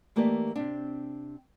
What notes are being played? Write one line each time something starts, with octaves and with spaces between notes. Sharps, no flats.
E3 A3 A#3 D#4 G4 D5
C3 C4 D4